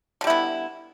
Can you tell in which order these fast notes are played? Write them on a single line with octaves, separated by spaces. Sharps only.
D3 G3 E4 B3